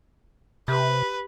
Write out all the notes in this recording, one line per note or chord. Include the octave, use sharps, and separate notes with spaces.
C3 G4 B4